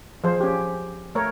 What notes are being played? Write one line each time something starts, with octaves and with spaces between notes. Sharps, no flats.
F3 G#4 C5
C#4 G4
A3 A#4 C#5